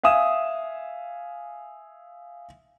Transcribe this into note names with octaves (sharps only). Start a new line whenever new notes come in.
E5 F5 G#5 D#6 E7